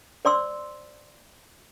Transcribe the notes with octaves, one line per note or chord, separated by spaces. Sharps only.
C5 D5 C6 E6